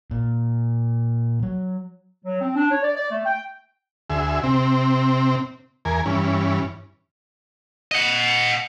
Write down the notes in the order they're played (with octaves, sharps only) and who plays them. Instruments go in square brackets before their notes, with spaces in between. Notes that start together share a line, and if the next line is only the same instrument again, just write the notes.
[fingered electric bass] A#2
F#3
[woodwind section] F#3
C4
D4
C#5
D5
D5
A3
G5
[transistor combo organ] D2 G#4 E5
C3 C4
E2 A#4 G#5
G2 E3 C#4
[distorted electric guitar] D#5 F#5